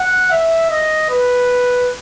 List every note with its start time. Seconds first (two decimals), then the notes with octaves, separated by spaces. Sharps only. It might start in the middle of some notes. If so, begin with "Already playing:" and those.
Already playing: F#5
0.31 E5
0.70 D#5
1.09 B4